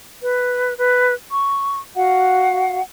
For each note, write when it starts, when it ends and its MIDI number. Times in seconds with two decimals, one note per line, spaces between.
0.21 0.72 71
0.77 1.13 71
1.30 1.77 85
1.95 2.80 66
1.95 2.80 77
1.95 2.80 78